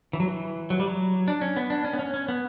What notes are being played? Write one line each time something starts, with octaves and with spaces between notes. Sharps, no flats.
E3
F#3
E3
F#3
G3
F#3
D4
C#4
B3
D4
C#4
B3
C#4
C#4
B3